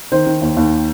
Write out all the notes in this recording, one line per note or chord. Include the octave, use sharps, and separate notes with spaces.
D#3 C5
D#3
D#2
D#2